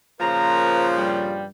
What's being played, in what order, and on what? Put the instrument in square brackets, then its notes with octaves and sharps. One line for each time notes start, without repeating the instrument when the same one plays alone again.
[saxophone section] A#2 C#3 F3 [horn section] A#4 C5 A#5
[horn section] G2 G3